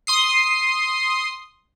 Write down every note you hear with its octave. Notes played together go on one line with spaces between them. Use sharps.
C6 D#6 C7